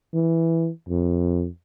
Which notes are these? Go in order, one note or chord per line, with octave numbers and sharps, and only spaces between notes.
E3
F2